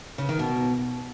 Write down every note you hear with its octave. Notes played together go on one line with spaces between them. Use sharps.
C#3
D#3
B2